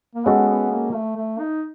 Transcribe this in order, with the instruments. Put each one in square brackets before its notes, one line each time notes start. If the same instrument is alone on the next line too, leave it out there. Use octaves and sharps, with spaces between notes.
[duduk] A#3
[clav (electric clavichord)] G#3 C#4 F#4 A4 [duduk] B3
[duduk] B3
A#3
A3
A3
D#4